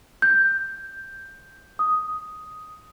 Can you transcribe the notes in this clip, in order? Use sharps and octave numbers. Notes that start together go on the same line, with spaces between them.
G6
D#6